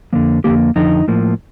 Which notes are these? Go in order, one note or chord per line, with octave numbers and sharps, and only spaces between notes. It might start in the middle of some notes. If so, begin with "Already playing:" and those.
F2 D3 F3 A#3
F2 D3 F3 A#3 G4
F2 D3 F3 D#4
A2 F3 A#3